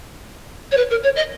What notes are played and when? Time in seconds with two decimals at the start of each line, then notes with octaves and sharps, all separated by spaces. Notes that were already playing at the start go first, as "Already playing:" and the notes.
0.72 C#5
0.77 B4
0.91 A#4
1.04 C#5
1.16 D#5